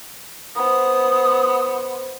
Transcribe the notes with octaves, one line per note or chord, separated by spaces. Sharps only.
B3 C5 D#6